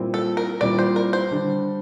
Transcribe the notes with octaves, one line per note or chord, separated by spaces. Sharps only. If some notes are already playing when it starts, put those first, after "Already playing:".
Already playing: A#2 G3 C4 E4
A4
A#4
A#2 G3 C4 E4 D5
C5
A#4
C5
D3 G3 D4